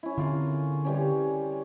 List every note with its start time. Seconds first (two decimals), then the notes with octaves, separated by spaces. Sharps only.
0.03 C#4 E4
0.17 D3 C4 F4 G#4 A#4
0.85 E3 G3 C#4